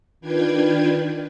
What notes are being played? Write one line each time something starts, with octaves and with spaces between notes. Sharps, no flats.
D#3 D4 F4 B4 G5 G#6